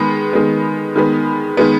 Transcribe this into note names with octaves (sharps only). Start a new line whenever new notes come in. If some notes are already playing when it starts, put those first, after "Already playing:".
Already playing: D#3 G#3 B3
D#3 G#3 B3
D#3 G#3 B3
D#3 G#3 B3